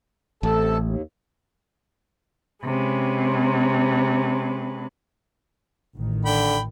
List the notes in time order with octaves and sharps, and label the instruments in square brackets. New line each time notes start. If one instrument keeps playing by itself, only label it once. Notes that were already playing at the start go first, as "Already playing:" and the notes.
[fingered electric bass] A1 [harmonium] C3 A4 A5
[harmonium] D#2
[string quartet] C3 G#3 C#4 B4
[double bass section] A1 D#3
[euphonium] D3 [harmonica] G5 B5